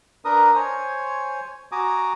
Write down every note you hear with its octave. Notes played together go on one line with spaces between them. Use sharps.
D4 A#4 B4 A#5 D#6
C5 C#5 G#5
F#4 G#5 A#5 D6 D#6